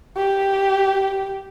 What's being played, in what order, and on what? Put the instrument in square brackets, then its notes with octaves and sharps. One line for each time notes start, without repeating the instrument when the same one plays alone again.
[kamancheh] G4